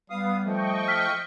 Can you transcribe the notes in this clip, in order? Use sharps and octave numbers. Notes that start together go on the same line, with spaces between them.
G3 B3 F5 D#6
F3 A3 D#5 G5 C#6
E6 F6 B6